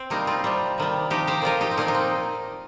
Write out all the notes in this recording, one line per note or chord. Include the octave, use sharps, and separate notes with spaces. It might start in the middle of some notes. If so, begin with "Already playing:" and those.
Already playing: C4
C3 G3 A#3 D#4
C4 F4
C3 G3
C3 D#3 G3
C3 F3 D#4 G4
G4 C5
A#2 F3 F4 A#4
D#4 G4
C4
A#2 F3 A#3 D#4
D#4
C4